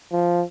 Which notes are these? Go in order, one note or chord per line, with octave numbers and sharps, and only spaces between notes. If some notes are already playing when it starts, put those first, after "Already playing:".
F3